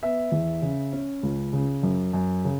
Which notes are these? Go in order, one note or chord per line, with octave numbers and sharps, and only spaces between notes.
B3 E5
E2
C#3
C#4
C#2
C#3
F#2
F#2
C#3